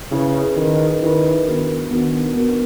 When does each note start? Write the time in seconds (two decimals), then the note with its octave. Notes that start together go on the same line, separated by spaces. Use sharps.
0.11 C#3 C#4 E4 G#4 B4
0.56 D#3 C#4 E4 G#4 B4
1.01 D#3 C#4 E4 G#4 B4
1.46 D#3 B3 D4 F#4 A#4
1.90 D#3 B3 D4 F#4 A#4
2.36 B3 D4 F#4 A#4